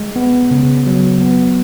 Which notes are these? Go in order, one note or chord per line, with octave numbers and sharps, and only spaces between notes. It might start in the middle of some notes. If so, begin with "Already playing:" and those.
Already playing: G#3
B3
C#3
F#3
B3